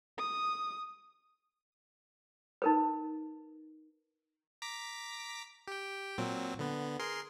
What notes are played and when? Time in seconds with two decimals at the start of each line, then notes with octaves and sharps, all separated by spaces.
0.18 D#6
2.62 D#4 A#4 B4
4.62 A#5 D6 B6
5.68 G4 G5
6.18 A#2 F#3 C4
6.59 D3 B3
6.99 G#4 A#4 C6